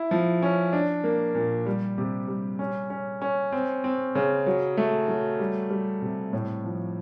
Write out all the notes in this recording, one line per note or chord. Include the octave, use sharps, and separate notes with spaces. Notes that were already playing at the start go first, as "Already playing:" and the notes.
Already playing: E4
F3
C#4
D4
A#3
A#2
G3
C3
G3
C#4
C#4
C#4
C4
C4
C#3
F#3
A3
F#3
G3
G3
C3
A2
F3